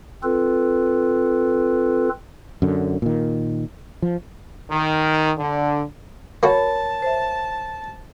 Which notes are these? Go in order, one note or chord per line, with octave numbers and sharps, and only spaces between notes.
C4 F4 A4 B4
F#2 D3
A#2 D#3
F3
D#3
D3
A#3 F#4 A#4 C#5 F#5 A5 B5
C5 E5